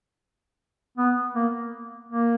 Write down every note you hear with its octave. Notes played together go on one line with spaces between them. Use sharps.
B3
A#3
A#3